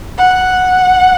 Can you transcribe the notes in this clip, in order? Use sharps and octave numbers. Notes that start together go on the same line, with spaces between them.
F#5